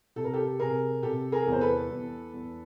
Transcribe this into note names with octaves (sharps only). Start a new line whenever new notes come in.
C3 A4
A#4
G4 A4
C3 G#4 A#4
C3 G4 A4
G#4 A#4
E2
C5
A4 B4
E2
E2